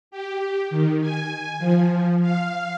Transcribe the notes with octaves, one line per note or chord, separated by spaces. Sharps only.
G4
D#3
G#5
F3
F5